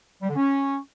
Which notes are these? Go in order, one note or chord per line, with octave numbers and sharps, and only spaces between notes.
G3
D3
C#4